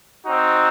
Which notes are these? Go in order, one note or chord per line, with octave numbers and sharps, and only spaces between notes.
C4 D#4 F#4